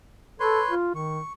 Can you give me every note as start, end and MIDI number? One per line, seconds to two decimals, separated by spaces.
0.40 0.61 69
0.40 0.75 71
0.40 0.75 73
0.40 0.75 84
0.71 0.93 65
0.95 1.20 51
0.95 1.33 85